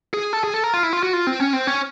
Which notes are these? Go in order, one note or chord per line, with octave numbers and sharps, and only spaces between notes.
G#4
A4
G#4
A4
A#4
F4
E4
F4
F#4
F4
C4
C#4
C4
C#4